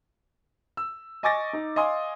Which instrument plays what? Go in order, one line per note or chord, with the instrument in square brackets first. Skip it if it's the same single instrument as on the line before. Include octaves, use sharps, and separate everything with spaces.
[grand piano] E6
D#5 G#5 C#6 D6 A6 A#6
D#4
D#5 F5 G#5 C6 D#6